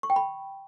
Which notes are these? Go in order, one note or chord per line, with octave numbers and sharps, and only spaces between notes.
C#6
G5
B5